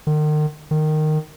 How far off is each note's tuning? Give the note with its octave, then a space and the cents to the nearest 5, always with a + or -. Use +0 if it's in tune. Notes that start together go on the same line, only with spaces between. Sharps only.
D#3 -40
D#3 -15